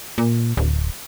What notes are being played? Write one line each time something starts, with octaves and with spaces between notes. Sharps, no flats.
A#2
D1